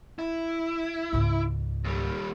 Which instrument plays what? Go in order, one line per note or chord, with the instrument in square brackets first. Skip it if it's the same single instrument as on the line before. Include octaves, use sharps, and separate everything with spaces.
[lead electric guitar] E4
[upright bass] C#2 G#2
[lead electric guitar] D#2 G3